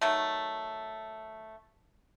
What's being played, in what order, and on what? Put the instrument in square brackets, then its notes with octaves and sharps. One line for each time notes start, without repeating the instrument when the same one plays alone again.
[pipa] D#3 F#3 A3